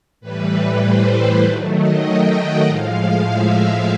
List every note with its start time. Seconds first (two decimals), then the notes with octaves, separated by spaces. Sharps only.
0.21 A2 E3 G3 B4
0.82 C5
1.43 D#3 F#3 A3 D5
1.74 D#5
2.04 G5
2.35 F#5
2.65 A2 F3 G#3 F5
3.26 E5
3.57 F5